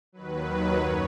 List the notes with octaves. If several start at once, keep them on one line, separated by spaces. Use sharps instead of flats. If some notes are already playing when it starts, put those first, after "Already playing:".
D#2 D#3 F#3 B4
F#2 C#5